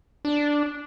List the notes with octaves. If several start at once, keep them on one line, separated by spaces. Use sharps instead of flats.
D4